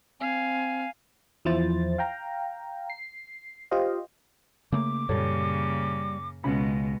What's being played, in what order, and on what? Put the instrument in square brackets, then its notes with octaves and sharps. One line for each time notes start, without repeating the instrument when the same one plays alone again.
[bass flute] C4 [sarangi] F5 [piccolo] G#5
[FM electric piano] E2 F3 E4 C5 A6
F5 G5 A#5
C7
F4 G4 C5 D#5 F5
[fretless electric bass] C#3 A3 A#3 [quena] D6
[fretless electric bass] F#2 A#2 [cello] C#3 A#3 [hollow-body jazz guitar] G3 A4 C#5
[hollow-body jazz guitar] C#2 C#4 B5 [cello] B2 G#3